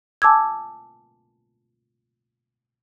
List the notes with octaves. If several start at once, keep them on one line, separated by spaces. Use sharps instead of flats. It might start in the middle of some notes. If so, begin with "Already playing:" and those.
G#5 A5 D6 E6 G#6